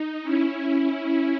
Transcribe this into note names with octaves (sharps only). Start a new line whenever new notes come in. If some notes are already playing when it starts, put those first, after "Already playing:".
Already playing: D#4
C#4 E4
C#4 E4